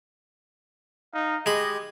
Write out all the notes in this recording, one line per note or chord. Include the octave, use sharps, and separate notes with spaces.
D#4 F5
G#3 G4 D#5 B5